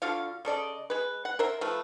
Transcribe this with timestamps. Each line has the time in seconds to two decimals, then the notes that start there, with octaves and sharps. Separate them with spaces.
0.02 D3 F4 F#4 F5
0.45 C#3 A4 D5 D#5
0.90 G#3 B4
1.25 F#5
1.39 A#4 C5 E5
1.61 F3 A3 B4